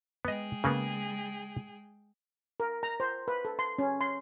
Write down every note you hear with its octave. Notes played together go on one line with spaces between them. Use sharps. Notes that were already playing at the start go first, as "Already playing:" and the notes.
G#3 B3 G#4 D#5 G5
C#3 A#3 B3
A#4
A#5
C5
B4
A4
C6
C#4
C6